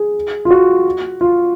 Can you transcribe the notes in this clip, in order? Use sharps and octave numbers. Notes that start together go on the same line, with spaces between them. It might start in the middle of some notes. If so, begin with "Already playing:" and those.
Already playing: G#4
F4
F#4
F4